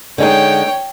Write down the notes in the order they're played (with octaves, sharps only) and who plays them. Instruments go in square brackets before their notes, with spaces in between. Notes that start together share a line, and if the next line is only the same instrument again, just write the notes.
[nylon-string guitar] D3 G#3 D#4 [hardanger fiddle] C#5 G5